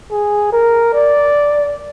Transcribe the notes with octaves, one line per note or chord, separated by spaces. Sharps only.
G#4
A#4
D5